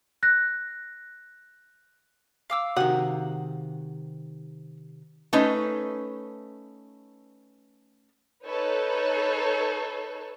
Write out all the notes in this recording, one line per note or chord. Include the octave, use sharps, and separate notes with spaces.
F#6 A#6
F5 D6 E6
C3 D#3 F#4 F#5
A3 C#4 D#4 B4
D#4 A4 B4 C#5